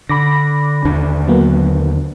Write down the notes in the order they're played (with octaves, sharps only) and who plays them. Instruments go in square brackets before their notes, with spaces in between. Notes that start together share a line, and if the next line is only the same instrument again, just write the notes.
[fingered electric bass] D3 [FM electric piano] B5 D6 A#6
[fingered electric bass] D#2 D3 D4
[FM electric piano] F#3 A#3 B3